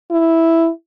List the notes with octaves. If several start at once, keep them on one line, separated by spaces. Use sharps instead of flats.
E4